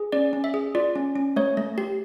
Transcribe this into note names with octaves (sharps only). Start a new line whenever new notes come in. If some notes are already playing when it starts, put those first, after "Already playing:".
Already playing: G#4
C#4 D5
C#4
E5
G#4
F4 D5
C#4
C#4
A3 C#5
A3
G4